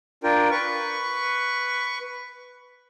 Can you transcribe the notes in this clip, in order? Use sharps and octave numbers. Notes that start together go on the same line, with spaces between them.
D4 F4 A#4 G5
B4 C#6